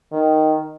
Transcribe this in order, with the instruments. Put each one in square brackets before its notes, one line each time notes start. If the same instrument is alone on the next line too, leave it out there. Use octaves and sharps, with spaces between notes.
[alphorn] D#3